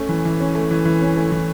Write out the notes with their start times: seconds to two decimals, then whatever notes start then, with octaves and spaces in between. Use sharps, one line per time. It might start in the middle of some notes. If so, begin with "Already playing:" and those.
Already playing: A3 C#4
0.09 E3
0.25 E3
0.40 C#4
0.55 A3
0.71 E3
0.85 E3
1.02 C#4
1.17 A3
1.32 E3